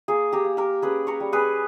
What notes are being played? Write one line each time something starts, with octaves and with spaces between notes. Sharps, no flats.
A#3 G#4
G4 A#4
A#3
G4 A#4
C#4 G#4 B4
A#4 C#5
G3
G#4 B4